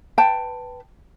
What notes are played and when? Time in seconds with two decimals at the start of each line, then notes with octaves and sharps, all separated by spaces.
0.18 B4 G5 A5